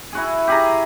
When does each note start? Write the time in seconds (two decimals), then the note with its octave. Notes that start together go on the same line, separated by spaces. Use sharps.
0.13 E4 F#4 G#4
0.47 G4 G#4 A#5